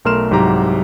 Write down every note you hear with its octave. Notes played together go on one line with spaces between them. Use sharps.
B1 A3 A#4 C6 F6 E7
C2 G#2 F#3 G4 A#5